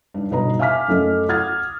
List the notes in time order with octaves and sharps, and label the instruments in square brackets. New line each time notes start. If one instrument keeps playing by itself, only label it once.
[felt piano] G2 D#4
G1 B2 D#4 B4 D#5 A#5
E5 F5 G#5 D6 F6 B6
F#2 A3 C#4 A4 D#5
F#5 D#6 F6 G#6 A6